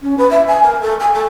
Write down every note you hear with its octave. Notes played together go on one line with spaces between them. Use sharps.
C#4
B4
E5
G#5
A#4
A4
G#5
A4